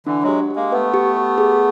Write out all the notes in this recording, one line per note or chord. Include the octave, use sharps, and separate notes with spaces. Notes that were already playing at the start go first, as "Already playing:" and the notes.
D3 E3 D4
F#3 G#3
G4
G4
G#3 A#3
A3 B3 B4
G4
G4
G#4